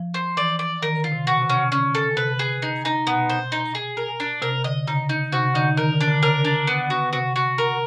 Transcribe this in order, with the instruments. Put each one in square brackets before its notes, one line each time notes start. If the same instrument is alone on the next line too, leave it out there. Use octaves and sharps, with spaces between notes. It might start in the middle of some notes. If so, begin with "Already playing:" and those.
Already playing: [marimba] F3
[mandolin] C5
[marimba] E3 [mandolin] D5
[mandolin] D5
[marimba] D#3 [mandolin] A#4
[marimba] D3
[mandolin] F4
[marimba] C3
[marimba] B2 [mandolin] F#4
[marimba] C3
[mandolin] C#4
[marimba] C#3
[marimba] D3 [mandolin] C#4
[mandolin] A4
[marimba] C3 [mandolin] B4
[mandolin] G#4
D#4
D#4
[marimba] B2 [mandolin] B3
[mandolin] C5
D#4
G#4
A#4
D4
[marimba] C3 [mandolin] A#4
[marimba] D3 [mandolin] D#5
[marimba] C#3 [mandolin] D#4
[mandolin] D#4
[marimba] C3 [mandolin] F#4
[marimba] D3 [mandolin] D#4
[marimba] D#3 [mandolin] A#4
[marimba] D3
[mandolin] D4
[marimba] D3
[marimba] C#3 [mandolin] A#4
[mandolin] D4
B3
F#4
[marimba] C3 [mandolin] F#4
[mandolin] F#4
A#4